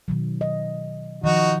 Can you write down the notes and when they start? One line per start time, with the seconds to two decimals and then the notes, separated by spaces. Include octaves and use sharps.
0.08 B2 D#3 F#3
0.41 D#5
1.24 D#3 F3 D#4 F#4